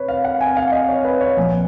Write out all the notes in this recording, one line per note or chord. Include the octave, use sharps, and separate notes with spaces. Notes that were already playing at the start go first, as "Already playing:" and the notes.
Already playing: B4 C#5
F5
F#5
G#5
F5
D#5
C#5
B4
C#5
A#1 A#2 F3 G#5